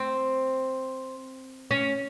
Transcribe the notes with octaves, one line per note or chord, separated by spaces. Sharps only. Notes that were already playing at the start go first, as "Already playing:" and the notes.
Already playing: C4
C#4